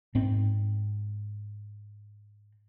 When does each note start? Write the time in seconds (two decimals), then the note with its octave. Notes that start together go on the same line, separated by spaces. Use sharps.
0.15 G#2 C4